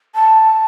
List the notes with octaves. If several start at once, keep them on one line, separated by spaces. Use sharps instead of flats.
A5